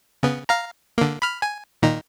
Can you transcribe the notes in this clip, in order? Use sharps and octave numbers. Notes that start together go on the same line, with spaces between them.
C#3 B3
F5 A#5
D3 A#3
B5 F6
G#5
A#2 D#3 D#4